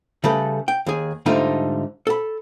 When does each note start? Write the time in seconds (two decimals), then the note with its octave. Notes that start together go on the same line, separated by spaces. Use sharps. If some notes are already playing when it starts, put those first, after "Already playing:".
0.24 C#3 G3 A3 A4 B4
0.68 G5
0.86 D#2 G#4
1.26 G#2 D3 G3 A3 D#4 F4
2.07 A4 B5